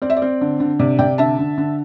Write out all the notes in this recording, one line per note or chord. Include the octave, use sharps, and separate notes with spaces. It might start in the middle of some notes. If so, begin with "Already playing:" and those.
C4 D5
E5
D5
C4
D3
D3
C3 D5
C3 D5 G5
D3 E5 A5
D3
D3